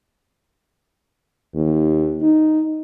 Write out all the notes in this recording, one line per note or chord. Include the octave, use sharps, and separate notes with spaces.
D#2
D#4